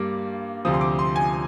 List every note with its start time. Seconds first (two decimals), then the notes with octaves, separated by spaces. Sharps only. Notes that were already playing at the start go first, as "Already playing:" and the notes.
Already playing: G2 G3 A#3 D6
0.65 D2 C3 F3 D#6
0.74 C6
0.81 D6
0.99 C6
1.16 G#5